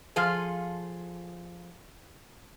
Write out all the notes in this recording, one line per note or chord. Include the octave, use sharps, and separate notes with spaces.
F3 F4 G#4 A4